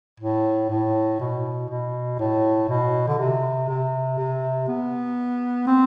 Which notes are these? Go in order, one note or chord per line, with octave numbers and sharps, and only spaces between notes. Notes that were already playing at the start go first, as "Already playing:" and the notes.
A2
A2
B2
B2
A2
B2
D3
C3
C3
C3
B3
C4